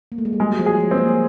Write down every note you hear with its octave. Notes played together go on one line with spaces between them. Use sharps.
A#3
A3
G#3
G3
F#3 G#3
F#3
F3
G#4
F3
C4
A#3